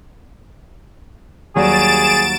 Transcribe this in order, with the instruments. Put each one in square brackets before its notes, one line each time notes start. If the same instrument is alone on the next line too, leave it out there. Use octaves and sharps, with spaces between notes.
[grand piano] D#2 F#3 G3 [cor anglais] G#4 [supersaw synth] A6 D7 E7